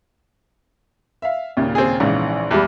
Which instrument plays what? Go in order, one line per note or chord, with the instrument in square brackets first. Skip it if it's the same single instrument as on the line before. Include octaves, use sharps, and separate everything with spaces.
[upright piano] E5 F5
D#2 A#2 C#3
[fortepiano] C4 G#4
[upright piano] A#1 E3 [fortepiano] G#2 C#3
[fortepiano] E2 G3